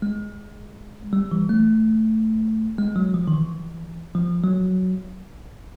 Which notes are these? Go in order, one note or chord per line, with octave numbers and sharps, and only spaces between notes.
G#3
G3
E3
A3
G#3
F#3
F3
D#3
E3
F3
F#3